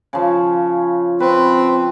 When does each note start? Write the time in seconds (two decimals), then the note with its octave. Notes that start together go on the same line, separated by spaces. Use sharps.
0.13 C#3 F3
1.20 C4 B4